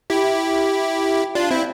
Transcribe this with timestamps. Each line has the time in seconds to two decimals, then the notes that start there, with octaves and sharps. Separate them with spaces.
0.10 E4 G4
1.35 D4 F4
1.51 C4 E4